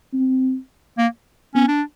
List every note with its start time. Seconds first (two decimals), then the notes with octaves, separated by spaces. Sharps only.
0.13 C4
0.98 A#3
1.55 B3 C#4
1.68 D4